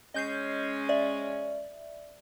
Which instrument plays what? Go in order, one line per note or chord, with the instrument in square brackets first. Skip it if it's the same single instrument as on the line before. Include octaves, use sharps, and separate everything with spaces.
[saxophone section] G#3 C#4 [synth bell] D#5 G6 C7
[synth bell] D5 E5